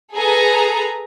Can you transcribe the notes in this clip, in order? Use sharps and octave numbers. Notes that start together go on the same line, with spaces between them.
G#4 A4 B4 G#5 A#5